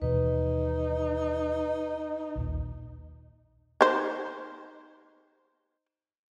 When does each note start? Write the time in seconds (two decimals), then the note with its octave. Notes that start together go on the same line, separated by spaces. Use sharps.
0.02 D#2 B2 E3 D#4 B4
2.36 A#1 D#2 A#2
3.81 D#4 C5